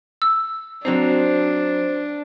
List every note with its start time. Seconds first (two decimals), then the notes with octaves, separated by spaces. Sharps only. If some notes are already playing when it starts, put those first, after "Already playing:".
0.22 E6
0.85 F#3 C4 D4 D#4 C5